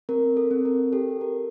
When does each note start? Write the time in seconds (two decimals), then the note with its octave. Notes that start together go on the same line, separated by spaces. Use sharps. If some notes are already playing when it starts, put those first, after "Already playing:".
0.09 C4 A#4
0.37 A4
0.51 C4
0.65 A#4
0.93 G4 A4
1.21 A#4